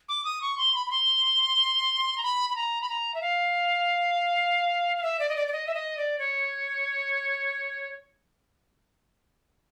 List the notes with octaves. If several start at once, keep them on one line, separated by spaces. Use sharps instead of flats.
D6
D#6
C#6
C6
B5
B5
C6
A#5
B5
B5
A#5
B5
A#5
E5
F5
F5
E5
D5
D#5
D5
D5
D#5
E5
D#5
D5
C#5